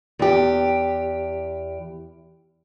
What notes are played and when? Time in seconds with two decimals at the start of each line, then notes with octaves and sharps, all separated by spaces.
0.19 E2 G4